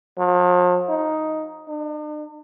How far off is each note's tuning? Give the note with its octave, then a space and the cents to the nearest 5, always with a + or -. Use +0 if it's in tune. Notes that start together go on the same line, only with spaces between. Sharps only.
F3 +40
D#4 +5
D4 +45